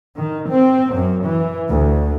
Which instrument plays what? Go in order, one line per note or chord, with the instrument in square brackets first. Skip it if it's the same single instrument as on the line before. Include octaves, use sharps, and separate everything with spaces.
[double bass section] D#3
C4
F#2
E3
D2